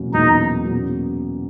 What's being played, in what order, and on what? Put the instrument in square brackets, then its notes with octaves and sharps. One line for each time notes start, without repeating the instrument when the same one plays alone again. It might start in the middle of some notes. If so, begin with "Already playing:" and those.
Already playing: [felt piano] E2 B2 F#3 A#3 C#4
[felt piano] E2 B2 F#3 A#3 C#4 [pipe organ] D#4
[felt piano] B2 F#3 A#3 C#4